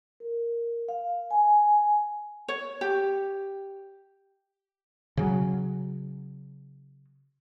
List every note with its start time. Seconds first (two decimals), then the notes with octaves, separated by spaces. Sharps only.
0.20 A#4
0.89 F5
1.31 G#5
2.48 C#5
2.81 G4
5.17 C#3 F#3